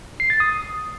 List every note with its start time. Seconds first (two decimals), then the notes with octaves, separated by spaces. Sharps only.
0.20 C7
0.30 A6
0.40 D#6